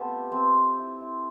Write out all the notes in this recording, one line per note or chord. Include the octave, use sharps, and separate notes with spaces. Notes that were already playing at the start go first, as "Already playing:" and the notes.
Already playing: A3 B3 C4 G4 A4 B4
F4
A3 C4 C5
A3
E4
E4